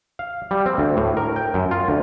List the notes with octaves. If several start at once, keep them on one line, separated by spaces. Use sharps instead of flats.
F5
G3
C4
D2
A2
A#4
G5
F#2
F4
D2